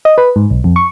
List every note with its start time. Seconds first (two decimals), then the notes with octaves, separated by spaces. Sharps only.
0.05 D#5
0.18 B4
0.36 G#2
0.50 B1
0.64 F2
0.76 C#6